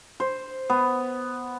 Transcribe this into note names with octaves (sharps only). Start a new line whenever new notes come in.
C5
B3